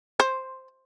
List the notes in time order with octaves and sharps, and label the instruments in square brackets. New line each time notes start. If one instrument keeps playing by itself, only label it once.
[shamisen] C5